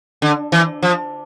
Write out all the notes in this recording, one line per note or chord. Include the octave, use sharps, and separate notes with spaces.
D3
E3
F3